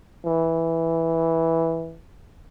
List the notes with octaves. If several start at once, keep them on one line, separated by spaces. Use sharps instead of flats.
E3